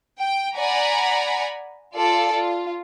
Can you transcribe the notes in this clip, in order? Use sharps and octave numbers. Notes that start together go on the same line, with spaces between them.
G5
D5 F#5 G#5 A#5 B5
F4 A4 D5
F4